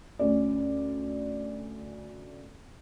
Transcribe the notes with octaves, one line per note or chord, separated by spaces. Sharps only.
D2 C#4 D5